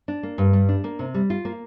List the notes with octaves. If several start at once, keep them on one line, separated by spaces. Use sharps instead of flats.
D4
A#3
G2
G3
D4
A#3
C3
G3
F4
A#3